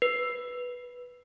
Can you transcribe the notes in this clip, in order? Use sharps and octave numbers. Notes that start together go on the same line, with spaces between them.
B4